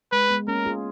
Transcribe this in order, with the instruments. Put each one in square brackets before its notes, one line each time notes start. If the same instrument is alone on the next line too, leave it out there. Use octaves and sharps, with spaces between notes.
[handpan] G#3 [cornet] B4
[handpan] G#3 B3
[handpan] A#3 C#4 [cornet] A#4
[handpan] F4 G#4